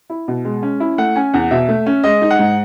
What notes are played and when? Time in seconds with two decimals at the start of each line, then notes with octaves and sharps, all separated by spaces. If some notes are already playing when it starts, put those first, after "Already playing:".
0.10 E4
0.28 B2
0.45 G#3
0.63 C#4
0.80 E4
0.98 A3 F#5
1.16 C#4 G#5
1.34 E2 F#5
1.51 B2 E5
1.69 A3
1.86 C#4
2.04 G#3 D#5
2.22 D#4
2.30 F#5
2.39 G#2